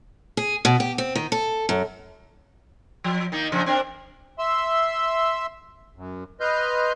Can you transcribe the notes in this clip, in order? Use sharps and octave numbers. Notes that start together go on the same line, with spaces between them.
G#4
B2
G4
C4
D#3
A4
F#2
F3
D#3 A#3 D#4
A#2 C#3 F3
C4 D4 A#4
E5 C6 E6
F#2
B4 D#5 C6 F6 G6